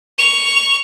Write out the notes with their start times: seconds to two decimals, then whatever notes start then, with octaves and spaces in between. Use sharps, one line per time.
0.18 C#6 F7